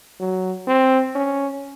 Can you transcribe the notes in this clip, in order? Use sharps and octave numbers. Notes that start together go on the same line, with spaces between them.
F#3
C4
C#4